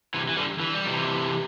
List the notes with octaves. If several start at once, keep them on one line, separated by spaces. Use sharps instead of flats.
C3 E3
E3
D3 G3
E3
G3
C3 E3